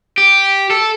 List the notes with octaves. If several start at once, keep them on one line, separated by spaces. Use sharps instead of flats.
G4
A4